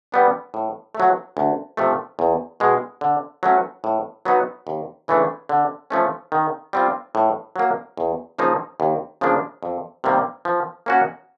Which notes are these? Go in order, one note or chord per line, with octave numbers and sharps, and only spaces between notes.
G3 B3 D4
A2
A3
F#3
D2
C3 F3 A3
E2
B2 G#3
D3
F#3 A3 C#4
A2
F#3 B3 D#4 F#4
D#2
C#3 E3 A3 D4
D3
F3 A3 C#4
D#3
G3 C4 F4
A2
F#3 A#3
E2
C#3 F3 A#3 D#4
D#2
C#3 F3 A#3 D4
F2
C3 D#3 G3 A#3
F3
A#3 C#4 F#4